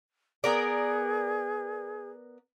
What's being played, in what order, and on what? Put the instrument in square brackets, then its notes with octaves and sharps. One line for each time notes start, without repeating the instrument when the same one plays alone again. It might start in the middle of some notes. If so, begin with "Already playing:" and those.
[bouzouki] B3 A#4 D5 [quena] G#4